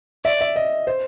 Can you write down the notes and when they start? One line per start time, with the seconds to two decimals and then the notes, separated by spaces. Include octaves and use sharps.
0.25 D5 E5
0.41 E5
0.56 D#5
0.87 C5